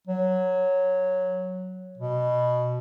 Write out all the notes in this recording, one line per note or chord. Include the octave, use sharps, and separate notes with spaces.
F#3
B2